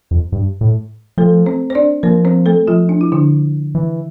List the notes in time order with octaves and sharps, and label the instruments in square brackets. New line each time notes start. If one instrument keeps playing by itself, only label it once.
[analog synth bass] F2
G2
A2
[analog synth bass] F3 [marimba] A3 A4
[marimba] C4 C5
C5
D4 D5
[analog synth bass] F3 [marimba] A#3 A#4
[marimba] C4 C5
A3 A4
F3 F4
D4
E4
D3 D4
[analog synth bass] E3